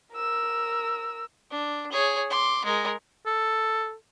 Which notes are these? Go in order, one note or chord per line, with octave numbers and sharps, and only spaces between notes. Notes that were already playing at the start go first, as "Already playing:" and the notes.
A#4 E6
D4
G#4 C#5
C6 D6
G#3 A#4
A4